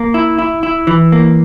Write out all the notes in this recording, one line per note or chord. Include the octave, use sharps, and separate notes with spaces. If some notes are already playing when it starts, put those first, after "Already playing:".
Already playing: A#3
E4
E4
E4
E3
A#3